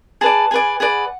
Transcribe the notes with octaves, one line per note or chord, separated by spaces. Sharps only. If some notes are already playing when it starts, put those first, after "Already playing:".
G#4 B4 D5 A5
G#4 B4 D5 G#5
G#4 B4 D5 F#5